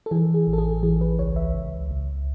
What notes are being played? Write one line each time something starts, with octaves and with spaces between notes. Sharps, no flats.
A4
E3 G#4
G#4
A1
A4
G#4
E3 G#4
B4
C#2 C#5
E5
C#2
C#2